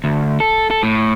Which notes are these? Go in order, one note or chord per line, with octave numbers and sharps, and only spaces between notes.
D2
A4
A4
A2